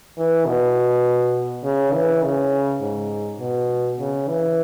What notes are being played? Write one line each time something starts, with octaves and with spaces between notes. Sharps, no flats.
E3
B2
C#3
E3
C#3
G#2
B2
C#3
E3